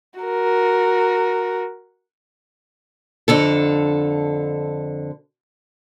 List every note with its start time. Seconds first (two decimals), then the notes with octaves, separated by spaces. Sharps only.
0.20 F#4 A#4
3.28 F2 D3 A4